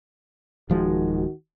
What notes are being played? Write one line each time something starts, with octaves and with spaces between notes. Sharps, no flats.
D1 D#3 F3 G#3 F#4